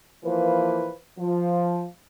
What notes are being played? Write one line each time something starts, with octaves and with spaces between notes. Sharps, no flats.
E3 F3 A#3 B4 C5
F3